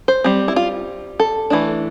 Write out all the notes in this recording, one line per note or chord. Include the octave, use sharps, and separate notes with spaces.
C5
G3 C4
E4
F4
A4
E3 A3 D4